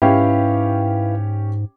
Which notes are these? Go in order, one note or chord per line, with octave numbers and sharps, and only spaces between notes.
G#2 C#4 E4 G4 B4 F5